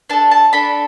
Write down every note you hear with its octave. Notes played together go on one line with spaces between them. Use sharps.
D4 A4 A5
A5
D4 A4 B5